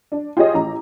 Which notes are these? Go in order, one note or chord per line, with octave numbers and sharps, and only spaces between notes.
D4
F4 G4 G#4 C#5 D#5
A1 A#5